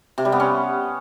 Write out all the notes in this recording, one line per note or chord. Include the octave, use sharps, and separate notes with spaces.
C3
G3
B3
C#4